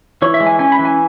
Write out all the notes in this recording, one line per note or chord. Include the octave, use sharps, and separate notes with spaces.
E3 C#5
E5
G#3
G#5
C#4 G#5
B5
E3
G#5